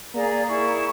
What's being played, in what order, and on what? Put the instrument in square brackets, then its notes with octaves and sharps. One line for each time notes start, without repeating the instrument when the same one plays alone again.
[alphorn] A#3 [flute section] G#4 D5 A#5
[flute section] E4 G#4 C#6